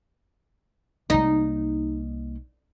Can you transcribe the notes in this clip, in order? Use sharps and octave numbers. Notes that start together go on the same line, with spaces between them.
C2 A#3 D#4